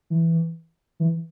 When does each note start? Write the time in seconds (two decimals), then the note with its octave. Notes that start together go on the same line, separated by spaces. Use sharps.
0.10 E3
1.00 E3